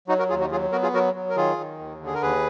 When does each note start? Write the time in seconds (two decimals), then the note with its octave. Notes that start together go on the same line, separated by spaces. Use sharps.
0.08 F#3 D#4 F#4
0.19 F#4 A#4
0.29 D#2 F4 G#4
0.40 D#4 F#4
0.51 F#3 F4 G#4
0.72 B3 F#4 A#4
0.82 F4 G#4
0.93 F#3 F#4 A#4
1.15 F#3
1.30 A#4
1.36 D#3 F4 G#4
1.57 D#3
1.79 D#2
2.00 D3
2.07 G#4
2.14 A#4
2.22 D#2 G#4 B4